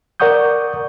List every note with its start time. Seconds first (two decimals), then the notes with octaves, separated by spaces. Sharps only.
0.20 A#4 D5 F#5 C#6 D#6 G6